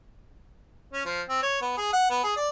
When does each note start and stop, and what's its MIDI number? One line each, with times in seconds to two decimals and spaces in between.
0.93 1.04 61
1.05 1.21 53
1.29 1.39 60
1.42 1.59 73
1.61 1.74 59
1.78 1.91 68
1.93 2.08 78
2.10 2.19 59
2.24 2.32 68
2.37 2.48 74